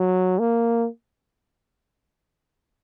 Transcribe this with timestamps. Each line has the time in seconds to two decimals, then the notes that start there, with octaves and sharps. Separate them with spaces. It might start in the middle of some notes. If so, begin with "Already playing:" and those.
Already playing: F#3
0.39 A#3